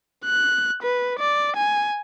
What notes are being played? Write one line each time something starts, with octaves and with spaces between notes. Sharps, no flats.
F#6
B4
D5
G#5